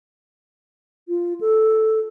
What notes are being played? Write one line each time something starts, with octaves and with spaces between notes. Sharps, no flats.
F4
A4